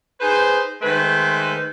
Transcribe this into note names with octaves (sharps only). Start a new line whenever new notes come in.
D#4 G#4 B4 C5
D#3 G#3 A3 B4 C5